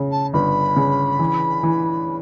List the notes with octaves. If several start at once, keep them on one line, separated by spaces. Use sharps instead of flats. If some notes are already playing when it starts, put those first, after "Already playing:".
Already playing: C#3
A5
G1 B5
C#3
E3
E3